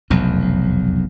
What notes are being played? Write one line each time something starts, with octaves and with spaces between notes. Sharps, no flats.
F1 B1 E2